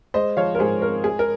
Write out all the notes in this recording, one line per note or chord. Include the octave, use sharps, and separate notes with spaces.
G#3 C5 D#5
F3 C#5 F5
A#4
G#2 G#4 C5
C4 A#4
G#3 G#4
A#4